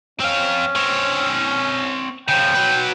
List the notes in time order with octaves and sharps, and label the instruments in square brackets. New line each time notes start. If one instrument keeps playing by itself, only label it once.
[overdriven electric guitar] C4 F5 [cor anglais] C#4
[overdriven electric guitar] C4 C#5
[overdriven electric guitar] C#3 F3 [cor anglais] G5
[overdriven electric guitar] F#3 B4